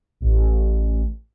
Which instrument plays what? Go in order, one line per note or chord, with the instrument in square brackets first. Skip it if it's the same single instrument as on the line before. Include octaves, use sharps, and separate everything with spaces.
[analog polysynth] A1